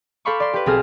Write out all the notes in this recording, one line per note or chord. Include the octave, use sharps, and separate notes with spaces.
A4 C5 F5 B5 C#6 D6
D5 C6
G4 B4
B1 C4 G#4 A4 F6 A#6